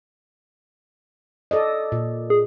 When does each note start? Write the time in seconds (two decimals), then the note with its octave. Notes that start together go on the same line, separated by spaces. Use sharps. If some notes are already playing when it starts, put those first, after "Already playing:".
1.51 A4 D5 D#5
1.92 A#2
2.30 G#4